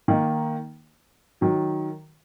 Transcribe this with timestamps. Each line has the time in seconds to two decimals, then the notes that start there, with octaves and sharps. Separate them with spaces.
0.08 D#3 A#3 D#4
1.41 D#3 F#3